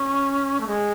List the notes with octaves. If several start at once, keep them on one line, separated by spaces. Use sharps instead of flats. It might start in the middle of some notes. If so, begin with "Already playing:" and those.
Already playing: C#4
A3
G#3